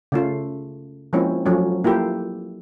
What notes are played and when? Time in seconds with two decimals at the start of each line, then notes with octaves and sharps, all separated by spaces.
0.12 C#3 A3 F4
1.13 F3 G#3 A#3 C4 C#4 E4
1.46 F3 F#3 A3 C#4
1.84 A#3 E4 F4 G4 A4